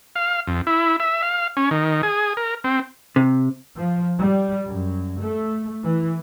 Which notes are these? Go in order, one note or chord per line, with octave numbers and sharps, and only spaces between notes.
F5
F2
E4
E5
F5
C#4
D#3
G#4
A#4
C4
C3
F3
G3
F#2
A3
E3